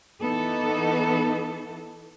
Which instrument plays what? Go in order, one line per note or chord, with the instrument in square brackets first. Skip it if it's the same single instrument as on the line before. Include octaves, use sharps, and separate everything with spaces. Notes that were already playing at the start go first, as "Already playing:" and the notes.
[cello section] E3 B3 D#4 A4